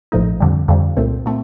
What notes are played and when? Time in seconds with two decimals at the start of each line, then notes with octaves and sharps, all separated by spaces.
0.12 A#1 A2 F3 A3 D#4
0.40 F2 D3 G3
0.68 F2 D3 G3
0.97 C2 A#2 A3 C4
1.26 A#2 A3 C4